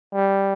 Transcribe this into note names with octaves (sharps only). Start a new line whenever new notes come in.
G3